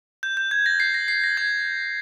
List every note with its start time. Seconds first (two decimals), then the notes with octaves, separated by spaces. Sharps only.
0.23 G6
0.37 G6
0.51 G#6
0.66 A#6
0.80 C7
0.94 A#6
1.08 C7
1.24 A#6
1.37 G#6